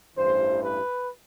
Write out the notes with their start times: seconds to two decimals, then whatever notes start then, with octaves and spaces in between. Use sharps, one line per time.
0.16 A1 G2 E3 C5
0.61 B4